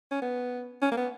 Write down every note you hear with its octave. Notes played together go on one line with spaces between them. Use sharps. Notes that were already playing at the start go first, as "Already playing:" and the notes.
C#4
B3
C#4
A#3
B3